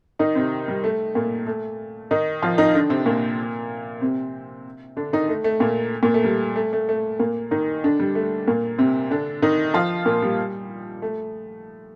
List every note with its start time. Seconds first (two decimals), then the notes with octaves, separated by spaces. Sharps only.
0.19 D#3 D#4
0.35 C3 C4
0.68 G3
0.84 A3
1.15 A#2 A#3
1.47 A3
2.11 D#3 D#4
2.43 F3 F4
2.58 D#3 D#4
2.74 D3 D4
2.90 C3 C4
3.06 A#2 A#3
4.01 C3 C4
4.97 D3 D4
5.13 D#3 D#4
5.28 A3
5.44 A3
5.60 A#2 A#3
6.03 A#2 A#3
6.14 A3
6.24 G3
6.56 A3
6.73 A3
6.89 A3
7.19 A#2 A#3
7.51 D#3 D#4
7.84 D3 D4
8.00 G3
8.15 A3
8.47 A#2 A#3
8.78 C3 C4
9.11 D3 D4
9.42 D#3 D#4
9.74 F3 F4
10.06 A#2 A#3
10.22 G3
11.02 A3